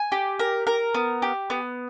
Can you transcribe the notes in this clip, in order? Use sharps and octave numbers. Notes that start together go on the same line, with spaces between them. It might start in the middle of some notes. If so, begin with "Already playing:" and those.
Already playing: G#5
G4
A#4
A#4
B3
G4
B3